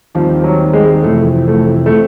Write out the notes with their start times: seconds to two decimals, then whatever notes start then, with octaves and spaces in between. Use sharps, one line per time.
0.15 D#2 D#3 F3 G3 C4
0.44 F#3
0.73 G#3
1.03 F2 C3 E3 A3
1.48 A3
1.86 A3
1.92 C4